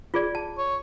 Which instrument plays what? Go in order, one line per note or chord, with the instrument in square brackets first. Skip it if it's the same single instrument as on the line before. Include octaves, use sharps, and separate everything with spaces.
[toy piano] F4 G#4 D5
A5
[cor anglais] C#5